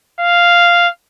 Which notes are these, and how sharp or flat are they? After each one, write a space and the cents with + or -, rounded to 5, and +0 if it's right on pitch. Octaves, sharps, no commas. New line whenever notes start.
F5 -5